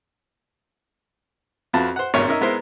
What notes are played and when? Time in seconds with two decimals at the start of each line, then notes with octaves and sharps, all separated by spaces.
1.74 F2 F4 F#4 B4 A5
1.96 C5 F#5
2.14 G#1 G2 B2 G4 A#4 C#5
2.28 C#4 D#4 A#4 E5
2.41 G#3 B3 E4 A#4 C5